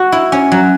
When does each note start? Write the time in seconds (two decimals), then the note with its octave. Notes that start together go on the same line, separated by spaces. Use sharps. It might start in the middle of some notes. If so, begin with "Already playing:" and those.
Already playing: F#4
0.12 E4
0.32 C#4
0.52 F#3